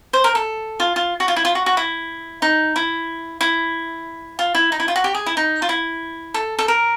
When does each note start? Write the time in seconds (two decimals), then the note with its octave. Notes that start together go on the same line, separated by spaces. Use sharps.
0.13 C5
0.24 A#4
0.35 A4
0.80 F4
0.96 F4
1.20 F#4
1.28 F4
1.36 E4
1.45 F4
1.55 F#4
1.66 F#4
1.77 E4
2.42 D#4
2.76 E4
3.41 E4
4.39 F4
4.55 E4
4.72 D#4
4.80 E4
4.88 F4
4.96 F#4
5.04 G4
5.15 G#4
5.26 E4
5.37 D#4
5.62 F4
5.69 E4
6.34 A4
6.59 A4
6.68 A#4